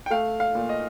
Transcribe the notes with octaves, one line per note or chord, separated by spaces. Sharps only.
G5
A3 F5
F5
A#2
D#5